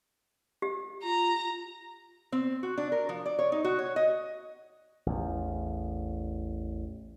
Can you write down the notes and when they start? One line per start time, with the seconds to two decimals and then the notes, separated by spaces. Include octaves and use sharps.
0.62 G4
1.03 F4 A#5
2.32 C4
2.63 F#4
2.78 D4
2.92 A#4
3.09 F3
3.26 D5
3.39 C#5
3.52 D#4
3.65 F#4
3.79 C#5
3.96 D#5
5.06 A1 E2